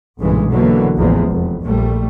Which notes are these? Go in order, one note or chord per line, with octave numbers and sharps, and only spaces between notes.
B1 G2 A#2 C#3 E3 G#3
B2 D3 E3 F#3 A#3
A1 E2 F3 G#3
F1
A#1 G3 A3